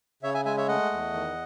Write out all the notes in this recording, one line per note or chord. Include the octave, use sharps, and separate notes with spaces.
C#3 C#5 E5
E5 G#5
G#3 E5 G#5
C#5 E5
A3 D#5 F#5
E2
D#3